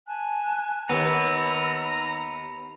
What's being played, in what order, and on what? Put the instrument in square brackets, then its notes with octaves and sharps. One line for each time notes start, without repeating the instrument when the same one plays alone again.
[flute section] G#5 A5 F#6
[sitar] D#2 [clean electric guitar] B3 [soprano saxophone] A#5 [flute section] B5 E6